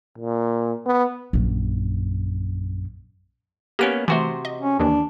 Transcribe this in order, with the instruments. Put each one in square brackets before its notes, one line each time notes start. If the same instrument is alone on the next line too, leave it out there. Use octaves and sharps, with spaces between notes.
[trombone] A#2
B3
[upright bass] A#1 F#2
[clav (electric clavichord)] A#3 B3 C#4 [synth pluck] G4 D7
[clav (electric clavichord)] C3 F#4 C5 [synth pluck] E3 A3
[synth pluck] D#5
[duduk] C#4
[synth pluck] D#2 D#3 E3 [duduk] D4